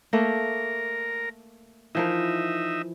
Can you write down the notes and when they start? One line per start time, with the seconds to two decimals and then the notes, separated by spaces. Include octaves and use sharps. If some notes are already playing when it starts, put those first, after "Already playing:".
0.13 A3 A#3 A#4
1.95 E3 F3 D#4 A#4 E5